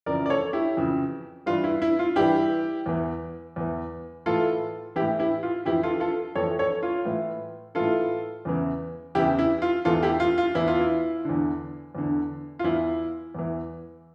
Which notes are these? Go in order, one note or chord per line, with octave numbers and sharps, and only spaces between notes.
F2 C#3 E3 A#4 D5
D5
A4 C#5
E4 G4
F2 C#3 E3
G2 E3 F4
E4
E4
F4
G2 E3 E4 G4
E2 E3
E2 E3
A2 E3 F4 A4
A2 E3 E4 G4
E4 G4
F4
F2 E3 E4 G4
F4 A4
F4 A4
F2 E3 A4 C#5
A4 C#5
F4
A2 E3
A2 E3 F4 A4
E2 C#3 E3
E2 C#3 E3 E4 G4
E4
F4
E2 E3 F4 A4
E4 G4
F4
F4
E2 E3 E4
F4
E4
E2 D3
E2 D3
F4
E2 E3 E4
E2 E3